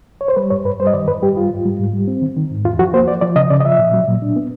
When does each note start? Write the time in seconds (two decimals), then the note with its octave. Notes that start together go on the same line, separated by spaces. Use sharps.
0.21 C#5
0.28 C5
0.36 G3 B4
0.50 G2 C#5
0.65 G2 B4
0.80 G3 C5
0.87 D#5
0.93 D#3 D5
1.08 G2 B4
1.22 G3 G4
1.36 G2 F4
1.50 G#2
1.65 G3
1.80 G#2
1.93 G3
2.08 C4
2.22 D#3
2.37 D#3
2.51 G#2
2.65 E2 F4
2.79 F3 F#4
2.94 A#3 C5
3.08 F3 D5
3.21 F3 D5
3.36 C#3 D#5
3.50 C#3 D5
3.60 D#5
3.65 F3 E5
3.79 A#2
3.94 F#3
4.08 A#2
4.22 D4
4.36 B3